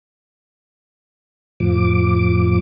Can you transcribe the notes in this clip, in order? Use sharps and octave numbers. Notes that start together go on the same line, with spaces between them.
F2 A2 F3 D6